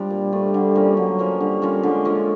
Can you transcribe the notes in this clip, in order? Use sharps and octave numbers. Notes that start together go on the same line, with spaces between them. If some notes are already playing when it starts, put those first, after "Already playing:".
Already playing: F3 G3 D4
A#2
F3 A3 D4
D3
F3 A#3 C#4
D3 F#3
F3 A#3 C#4
D3 G3
F3 A#3 C#4
D3 G#3
F3 A#3 C#4